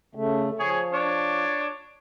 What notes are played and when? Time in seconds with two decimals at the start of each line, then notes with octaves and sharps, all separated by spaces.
0.15 C#3 A3
0.59 F3 G#4 C#5
0.93 D4 C#5